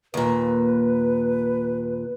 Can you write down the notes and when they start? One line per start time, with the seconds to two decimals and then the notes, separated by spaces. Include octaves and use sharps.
0.14 D#2 A#2 B4